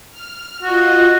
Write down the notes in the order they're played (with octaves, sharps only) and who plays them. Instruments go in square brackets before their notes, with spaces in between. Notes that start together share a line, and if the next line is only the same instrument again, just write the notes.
[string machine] F6
[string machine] F4 D#5 [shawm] F#4